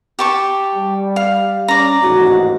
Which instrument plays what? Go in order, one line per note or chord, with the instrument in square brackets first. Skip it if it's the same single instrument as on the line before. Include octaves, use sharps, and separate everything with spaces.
[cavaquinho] G4 A5 C#6
[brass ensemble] G3
[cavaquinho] F5
[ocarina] C#4 [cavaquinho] D5 A#5
[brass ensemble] A1 D#2 G#2 [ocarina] F#4